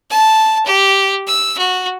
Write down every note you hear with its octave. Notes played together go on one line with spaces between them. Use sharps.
A5
G4
E6
F#4